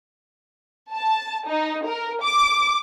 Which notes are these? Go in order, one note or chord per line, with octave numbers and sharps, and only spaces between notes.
A5
D#4
A#4
D6